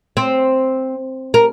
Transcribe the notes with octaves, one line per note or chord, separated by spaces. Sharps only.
C4
A#4